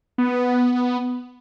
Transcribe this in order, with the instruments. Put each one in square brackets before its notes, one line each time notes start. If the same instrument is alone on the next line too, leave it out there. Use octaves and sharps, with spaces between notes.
[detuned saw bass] B3